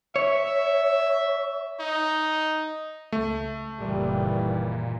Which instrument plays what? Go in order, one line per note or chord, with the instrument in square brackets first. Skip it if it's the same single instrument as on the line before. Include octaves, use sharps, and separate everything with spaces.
[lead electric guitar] C#5 [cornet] E5
[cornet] D#4
[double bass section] C#2 [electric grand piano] A3
[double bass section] F#1 D#3 E3 [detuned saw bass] A#2 [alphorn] G3